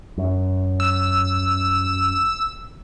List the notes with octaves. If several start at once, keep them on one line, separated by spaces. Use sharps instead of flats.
F#2
E6